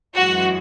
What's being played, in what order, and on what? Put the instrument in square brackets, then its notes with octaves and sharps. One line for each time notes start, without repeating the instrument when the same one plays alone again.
[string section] F#2 E3 G#3 F#4